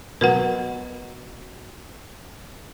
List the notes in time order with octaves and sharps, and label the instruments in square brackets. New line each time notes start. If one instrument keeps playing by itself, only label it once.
[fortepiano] B2 F#3 [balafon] A#4 B4 F#5